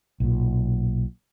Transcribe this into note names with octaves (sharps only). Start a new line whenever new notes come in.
B1 A#2